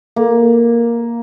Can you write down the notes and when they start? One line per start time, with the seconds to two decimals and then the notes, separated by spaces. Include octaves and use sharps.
0.16 A#3